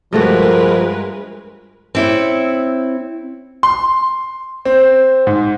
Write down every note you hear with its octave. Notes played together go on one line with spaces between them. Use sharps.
G2 F3 G#3 A3 F#4 A#4 B4
C4 E4 C#5
C6
C4
G#2